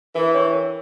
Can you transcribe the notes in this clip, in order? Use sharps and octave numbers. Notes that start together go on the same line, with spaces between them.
E3 A#4
C#5 G5 C#6
A#4